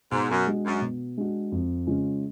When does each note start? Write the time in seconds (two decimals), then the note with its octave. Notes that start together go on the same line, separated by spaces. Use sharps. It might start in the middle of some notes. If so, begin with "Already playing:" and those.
0.12 G#2 B2
0.29 F#2
0.47 G#3 D4 F#4
0.65 F#2
0.82 B2
1.18 G#3 D4 F#4
1.52 F2
1.87 C#3 G#3 C#4 F4